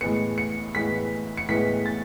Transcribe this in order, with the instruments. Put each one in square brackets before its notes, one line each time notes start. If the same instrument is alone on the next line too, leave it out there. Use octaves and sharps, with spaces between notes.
[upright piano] A2 E3 G#3 B3 C#7
C#7
A2 E3 G#3 B3 B6
C#7
A2 E3 G#3 B3 B6
A6